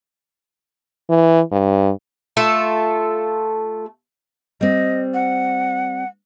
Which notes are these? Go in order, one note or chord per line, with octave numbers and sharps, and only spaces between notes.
E3
G2
A3 F4 A4
G3 C4 D#5
F#5